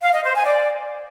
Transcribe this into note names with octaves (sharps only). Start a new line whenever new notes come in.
F5
D#5
C5
G#5
D5